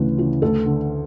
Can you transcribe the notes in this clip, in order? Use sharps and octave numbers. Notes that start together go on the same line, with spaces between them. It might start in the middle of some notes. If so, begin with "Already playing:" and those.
Already playing: D2 C#3 E3 B4
C#3 E3
D2 A4
D3